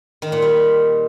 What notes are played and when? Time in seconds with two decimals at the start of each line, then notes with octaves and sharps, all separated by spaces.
0.22 D#3
0.32 A#2
0.42 G3